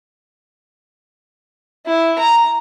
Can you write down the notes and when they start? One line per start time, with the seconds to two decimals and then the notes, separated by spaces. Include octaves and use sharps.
1.86 E4
2.19 A#5